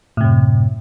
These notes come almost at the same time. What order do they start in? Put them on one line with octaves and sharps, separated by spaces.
A2 C3 F#2